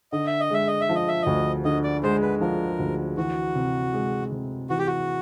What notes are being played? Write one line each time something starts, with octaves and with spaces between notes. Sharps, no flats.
D3 D#5
E5
D#5
G#3 E5
D#5
E5
F3
D#5
E5
D2 D#5
D3 D#5
D5
G#3 C5
B4
F3 A#4
D2
E3 F#4
C3
G#3
C3
E3 F#4
G4
F#4